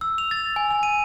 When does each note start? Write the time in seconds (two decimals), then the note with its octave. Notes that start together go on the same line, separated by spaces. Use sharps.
0.01 E6
0.18 F7
0.31 A6
0.56 G#5
0.71 G#5
0.83 D#7